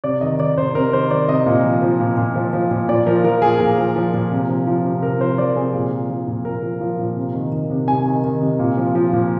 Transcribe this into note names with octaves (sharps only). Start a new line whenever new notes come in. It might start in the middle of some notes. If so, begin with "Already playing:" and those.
C3 D5
D#3 D#5
D#3 D5
C3 C5
C3 A#4
D#3 C5
D#3 D5
C3 D#5
A#2
F3
F3
A#2
A#2
F3
F3
A#2
A#2 D5
F3 A#4
F3 A#4
A#2 G#4
A#2 A#4
F3
F3
A#2
C3
F3
F3
C3
C3 A#4
F3 C5
F3 D5
C3 G#4
A#2
F3
F3
A#2
A#2 A#4
F3
F3
A#2
C3
D#3
D#3
C3
C3 G#5
D#3
D#3
C3
A#2
F3
F3
A#2